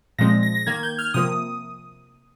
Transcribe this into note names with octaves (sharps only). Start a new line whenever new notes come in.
A#2 F3 G#3 C4 A#6
A#6
A#6
D#3 A#3 G#6
G6
F6
C3 F3 A#3 D#6